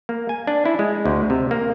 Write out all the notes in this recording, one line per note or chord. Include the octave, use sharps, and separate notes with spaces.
A#3
G#5
D4
E4
G#3
D2
C3
A#3